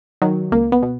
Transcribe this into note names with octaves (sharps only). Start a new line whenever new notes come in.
D#3 F#3
C#2 A#3
B3
B2